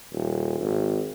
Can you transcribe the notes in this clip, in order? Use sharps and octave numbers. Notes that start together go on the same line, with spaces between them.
D#1
G#1